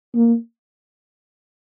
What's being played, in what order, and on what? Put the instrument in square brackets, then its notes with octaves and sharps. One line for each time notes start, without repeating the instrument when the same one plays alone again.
[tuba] A#3